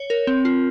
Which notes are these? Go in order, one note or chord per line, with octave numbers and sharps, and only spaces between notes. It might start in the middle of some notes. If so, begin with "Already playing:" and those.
Already playing: C#5
A#4
C4
F4